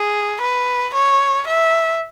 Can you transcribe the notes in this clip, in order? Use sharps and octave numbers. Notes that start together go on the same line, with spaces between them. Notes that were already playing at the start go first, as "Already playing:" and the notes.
Already playing: G#4
B4
C#5
E5